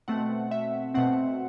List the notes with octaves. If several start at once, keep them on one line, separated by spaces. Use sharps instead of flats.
B2 A3 C4 F#5
E5
B2 A3 C4 F#5